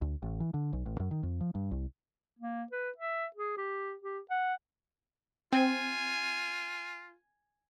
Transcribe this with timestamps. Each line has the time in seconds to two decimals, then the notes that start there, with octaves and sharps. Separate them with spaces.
0.02 D2
0.22 A1
0.40 E3
0.54 D3
0.73 B1
0.86 A1
1.00 F#2
1.11 D#3
1.23 F2
1.41 F3
1.55 G2
1.71 C2
2.39 A#3
2.72 B4
2.98 E5
3.36 G#4
3.57 G4
4.02 G4
4.30 F#5
5.53 C4 F4 G#5